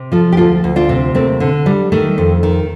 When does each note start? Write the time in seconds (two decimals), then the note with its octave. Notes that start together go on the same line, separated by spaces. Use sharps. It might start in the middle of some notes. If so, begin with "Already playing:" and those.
Already playing: C3
0.12 F3 F4 A4
0.32 G4
0.37 D2 F4 A4
0.64 D2
0.76 D4 F4
0.89 C3
1.15 D#2 A3 C4
1.40 D3
1.66 G3
1.92 D#3 A3
2.18 F2
2.43 D#3